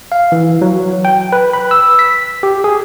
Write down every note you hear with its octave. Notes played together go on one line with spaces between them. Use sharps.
F5
E3
F#3
G5
B4
B5
E6
B6
G4
G#4